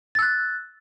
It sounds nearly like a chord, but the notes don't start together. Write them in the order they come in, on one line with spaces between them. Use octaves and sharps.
A6 E6 F#6